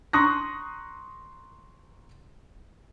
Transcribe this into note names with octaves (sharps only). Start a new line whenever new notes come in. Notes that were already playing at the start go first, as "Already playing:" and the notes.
A#5 C6 C#6 D#6 F#6 A#6